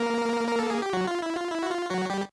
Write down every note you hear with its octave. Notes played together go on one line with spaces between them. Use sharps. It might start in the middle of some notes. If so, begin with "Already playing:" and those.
Already playing: A#3 A#4
A#4
A4
G#4
G4
F#3 F#4
F4
E4
F4
E4
F#4
F4
F#3 F#4
G3 G4